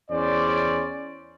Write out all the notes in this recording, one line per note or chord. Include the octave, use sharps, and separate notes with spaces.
E2 C#4 C5 D5